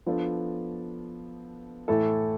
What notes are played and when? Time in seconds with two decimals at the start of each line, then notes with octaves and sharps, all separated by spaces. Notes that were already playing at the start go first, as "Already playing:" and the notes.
0.06 F3 B3 D4 F4 A4
1.88 A2 E3 A3 E4 A4